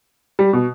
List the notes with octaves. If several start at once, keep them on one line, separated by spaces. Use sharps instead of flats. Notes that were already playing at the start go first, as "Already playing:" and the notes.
G3
B2